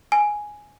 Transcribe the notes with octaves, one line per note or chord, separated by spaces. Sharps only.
G#5